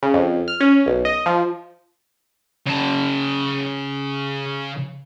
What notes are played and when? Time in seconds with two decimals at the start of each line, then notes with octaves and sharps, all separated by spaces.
0.03 C#3
0.14 F2
0.48 F6
0.60 C#4
0.86 B1
1.05 D#5
1.26 F3
2.66 C#3 A5